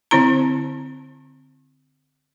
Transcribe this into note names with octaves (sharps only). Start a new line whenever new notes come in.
D3 C4 E4 A#5